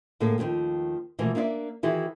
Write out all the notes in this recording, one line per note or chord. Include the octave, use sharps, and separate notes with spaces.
A2 D3 A#3 G#4 A4
D#2 A#2 D3 D#3 F3
B2 E3 F3 G3 A3 A#3
A#3 D4 E4 D5 E5
D#3 E3 E4 F#4 G#4